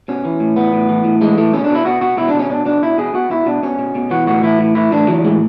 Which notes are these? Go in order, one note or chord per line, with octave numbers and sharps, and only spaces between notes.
B2 C#4
E3
A2
E3 B3
A2
E3
A2
E3 G#3
A2 A3
B2 C#4
D4
B2 E4
B2 F#4
B2 F#4
B2 E4
B2 D4
C#4
B2 D4
B2 D4
B2 E4
B2 G#4
B2 F#4
B2 E4
B2 D4
B2 C#4
B2
B2
E3 F#4
A2 F#4
E3 E4
A2
E3 E4
A2 D4
E3 F#3
A2 G#3